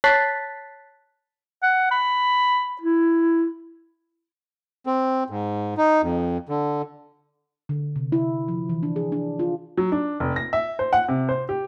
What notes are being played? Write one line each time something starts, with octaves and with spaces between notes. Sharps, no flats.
C#5 A5 F#6 A6 B6 C7
F#5
B5
E4
C4
G#2
D#4
F2
D3
D3
C3
E4
F3
E3
D4
G#4
D4
F4
F#3
D4
F1
A#6
E5
C5
F#5
C3
C5
G4